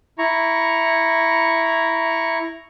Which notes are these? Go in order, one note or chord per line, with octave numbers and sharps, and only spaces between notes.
E4 A#5 C#6